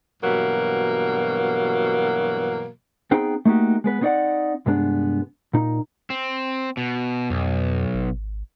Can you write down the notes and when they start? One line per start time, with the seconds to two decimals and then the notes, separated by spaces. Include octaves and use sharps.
0.22 G2 B2 E3 F#3 A#3
3.11 B3 C4 D#4 G#4 G5
3.45 A3 A#3 D#4 F#4 G4
3.84 G#3 B3 B4
4.01 B3 C4 D#4 C#5 D5 F#5
4.66 C2 G2 G#3 B3 D4
5.54 A#2 D#4
6.10 C4
6.77 B2
7.30 B1 F2
7.94 G#1